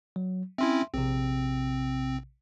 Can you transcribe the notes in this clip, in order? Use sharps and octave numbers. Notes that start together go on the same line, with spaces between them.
F#3
C4 C#4 E4 E5 C6
A#1 C3 C4